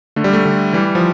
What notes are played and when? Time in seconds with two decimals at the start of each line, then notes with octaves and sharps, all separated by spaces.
0.16 D3 A3
0.24 G3
0.33 A3
0.45 D3
0.73 E3 G3
0.95 F3